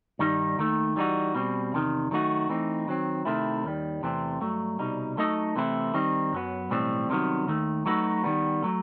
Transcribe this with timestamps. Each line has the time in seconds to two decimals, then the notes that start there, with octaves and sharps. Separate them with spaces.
0.19 G2 D#3 G3 D#4
0.58 D#2 D#3 A3
0.96 E3 G3 D#4 F#4
1.34 B2 G3 C4
1.72 E2 C3 D#3
2.11 D#3 F#3 A3 D#4 F#4
2.49 E3 A3 C4 D#4
2.88 D#3 F#3 C4
3.25 C3 D#3 A3 C4 E4
3.64 D#2 D#3 G3
4.02 E2 C3 E3 A3 C4
4.41 G2 F#3 A3
4.79 C2 B2 G3 D#4
5.17 F#3 A3 D#4 A4 D#5
5.56 C3 E3 A3 C4 E4
5.94 D#3 G3 C4 D#4
6.33 F#2 F#3 B3
6.71 B1 A2 E3 G3 C4
7.09 C2 C3 D#3 F#3 B3
7.48 D#2 D#3 A3
7.86 F#3 A3 D#4 F#4 B4
8.24 D#3 G3 B3
8.62 F#3 A3